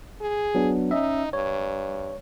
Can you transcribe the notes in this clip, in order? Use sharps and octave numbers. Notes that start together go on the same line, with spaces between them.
G#4
F#3 B3 D4
C#4 D#4 D#5 E5
G2 C#5